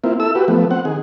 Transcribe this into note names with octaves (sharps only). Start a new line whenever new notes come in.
A#3 C4 E4 F4
E4 A4 E6
F#4 G4 B4
F3 A3 B3
C4 F#5
D#3 G#4